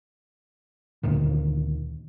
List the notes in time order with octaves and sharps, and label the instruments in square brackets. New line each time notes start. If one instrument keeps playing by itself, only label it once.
[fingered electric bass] D2 A#2 D3 D#3